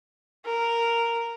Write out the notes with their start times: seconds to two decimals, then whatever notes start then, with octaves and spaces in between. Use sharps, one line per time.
0.46 A#4